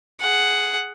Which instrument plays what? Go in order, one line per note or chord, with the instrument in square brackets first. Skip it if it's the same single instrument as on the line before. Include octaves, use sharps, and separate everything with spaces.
[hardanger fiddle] G#4 F#5